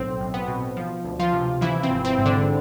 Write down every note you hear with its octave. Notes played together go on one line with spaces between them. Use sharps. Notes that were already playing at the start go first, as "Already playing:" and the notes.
Already playing: B1 A2 C4
B1
B3
B2
F3
D2
F3 F4
C3
E3 F3 E4
C4
G#1
C4
G#2
D3 D4